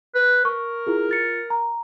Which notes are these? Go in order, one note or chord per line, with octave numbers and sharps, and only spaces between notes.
B4
A#4 C#6
E4 F4 G#4
F4 A6 C#7
A#5